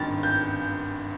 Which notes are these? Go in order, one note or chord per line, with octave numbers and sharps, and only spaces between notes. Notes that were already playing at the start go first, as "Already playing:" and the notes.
Already playing: G#1 G2 D#3 A6
G6